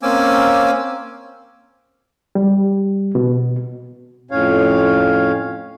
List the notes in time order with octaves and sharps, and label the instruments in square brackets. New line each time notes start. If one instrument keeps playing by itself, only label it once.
[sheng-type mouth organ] A#3 C4 C#4 G#5 D6 E6
[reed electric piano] G3
B2
[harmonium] F2 A2 C#4 C#5 F5